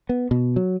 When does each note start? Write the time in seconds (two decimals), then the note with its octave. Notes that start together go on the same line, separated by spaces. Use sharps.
0.09 B3
0.31 B2
0.56 F#3